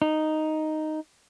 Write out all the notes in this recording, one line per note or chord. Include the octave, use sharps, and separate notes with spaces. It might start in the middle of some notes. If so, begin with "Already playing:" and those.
D#4